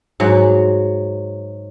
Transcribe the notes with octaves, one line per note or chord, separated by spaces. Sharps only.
G#2 F#3